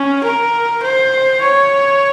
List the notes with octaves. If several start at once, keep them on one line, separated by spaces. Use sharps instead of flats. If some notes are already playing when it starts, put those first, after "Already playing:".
Already playing: C#4
A#4
C5
C#5